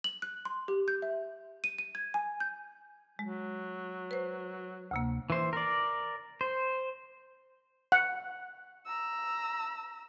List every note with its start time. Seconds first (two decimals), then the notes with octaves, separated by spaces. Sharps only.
0.04 F#7
0.22 F#6
0.45 C6
0.68 G4
0.88 G6
1.02 E5
1.64 D#7
1.78 D#7
1.95 G#6
2.14 G#5
2.40 G6
3.19 F#3 G#3
4.11 B4 C5
4.91 D2 C3 A#3
5.30 E3 C5
5.53 A#4 D5
6.41 C5
7.92 F#5
8.86 A#5 E6